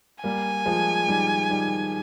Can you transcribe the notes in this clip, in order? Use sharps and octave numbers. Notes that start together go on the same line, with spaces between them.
G3 A#3 G#5
F3 G#3
D#3 G3
D#3 G3